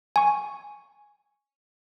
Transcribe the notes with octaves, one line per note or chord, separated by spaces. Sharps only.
G#5 C#6